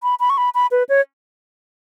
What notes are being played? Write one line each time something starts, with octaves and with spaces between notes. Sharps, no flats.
B5
B5
C#6
B5
B5
B4
C#5